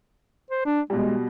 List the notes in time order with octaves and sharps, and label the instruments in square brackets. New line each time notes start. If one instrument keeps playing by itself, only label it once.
[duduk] C5
D4
[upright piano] B2 G3 [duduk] G#3